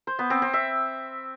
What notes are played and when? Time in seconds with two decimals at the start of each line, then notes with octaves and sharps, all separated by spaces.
0.07 C5
0.19 B3
0.30 C4
0.42 C4
0.53 E5